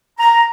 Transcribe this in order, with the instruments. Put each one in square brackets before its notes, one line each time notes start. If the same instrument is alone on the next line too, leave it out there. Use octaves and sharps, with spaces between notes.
[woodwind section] A#5